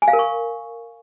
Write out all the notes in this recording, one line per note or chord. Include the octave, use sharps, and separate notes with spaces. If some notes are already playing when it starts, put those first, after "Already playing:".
G#5
F5
A#4
C#6